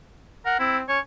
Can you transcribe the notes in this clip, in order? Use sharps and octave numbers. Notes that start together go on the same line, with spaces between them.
A#4 F#5
C4 E4
C#4 C#5